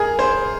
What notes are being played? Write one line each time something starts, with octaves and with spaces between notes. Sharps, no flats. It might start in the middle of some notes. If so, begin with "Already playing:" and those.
Already playing: G#4 A#4
C5